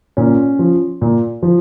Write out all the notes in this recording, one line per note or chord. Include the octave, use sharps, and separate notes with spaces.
A#2 C#4
F3
A#2
F3